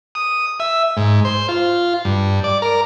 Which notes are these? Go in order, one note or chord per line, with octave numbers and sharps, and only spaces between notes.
D#6
E5
G#2
C5
F4
G2
D5
A#4